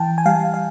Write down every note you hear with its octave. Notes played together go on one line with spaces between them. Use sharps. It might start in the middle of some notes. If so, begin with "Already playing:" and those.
Already playing: E3 G5 A5
G#5
G3 F5 G5
F5